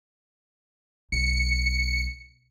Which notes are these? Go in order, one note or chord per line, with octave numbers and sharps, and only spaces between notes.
B1 C#7